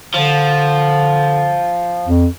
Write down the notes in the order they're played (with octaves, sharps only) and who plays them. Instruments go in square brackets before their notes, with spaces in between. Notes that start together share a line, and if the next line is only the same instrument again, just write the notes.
[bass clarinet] D3 [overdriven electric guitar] F3
[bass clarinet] F2